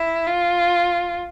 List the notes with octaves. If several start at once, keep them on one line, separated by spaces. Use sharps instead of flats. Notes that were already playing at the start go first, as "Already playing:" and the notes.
Already playing: E4
F4